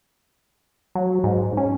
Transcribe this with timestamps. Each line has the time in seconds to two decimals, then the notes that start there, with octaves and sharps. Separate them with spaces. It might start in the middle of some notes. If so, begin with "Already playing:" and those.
0.95 F#3
1.24 G#2
1.57 C#4